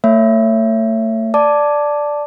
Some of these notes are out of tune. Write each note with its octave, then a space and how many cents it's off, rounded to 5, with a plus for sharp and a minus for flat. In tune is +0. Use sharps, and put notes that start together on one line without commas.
A3 +35 C#5 +0 E5 +20
D5 +0 A5 +0 D6 +0